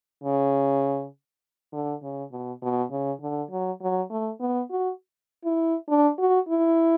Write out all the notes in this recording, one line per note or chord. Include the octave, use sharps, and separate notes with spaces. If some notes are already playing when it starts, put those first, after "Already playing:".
C#3
D3
C#3
B2
B2
C#3
D3
F#3
F#3
A3
B3
F#4
E4
D4
F#4
E4